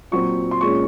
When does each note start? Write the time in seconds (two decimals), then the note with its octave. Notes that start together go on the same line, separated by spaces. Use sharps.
0.11 A#2 F#3 C4 C#6
0.51 C6
0.61 A#2 G#3 C#4 C#6